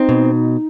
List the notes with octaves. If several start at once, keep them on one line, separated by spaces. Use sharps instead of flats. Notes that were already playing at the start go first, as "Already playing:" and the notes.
Already playing: C4 D#4
B2